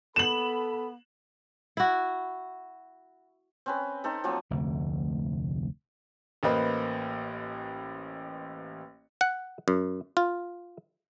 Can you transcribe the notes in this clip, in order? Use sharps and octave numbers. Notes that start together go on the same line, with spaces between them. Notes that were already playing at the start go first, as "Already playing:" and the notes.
B3 A4 B5 E7 F#7
E4 F#4
C4 C#4 B4
C4 D#4 A4
F3 F#3 A#3 C4
F1 D2 C3
A1 A#3 B4 C5 D#5 B5
F#5
F#2
F4